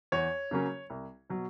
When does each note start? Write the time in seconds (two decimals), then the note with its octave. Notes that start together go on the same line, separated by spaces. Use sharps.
0.12 E2 C#5
0.51 C#3 F#3 A#3 C#4
0.90 C2
1.30 B2 F#3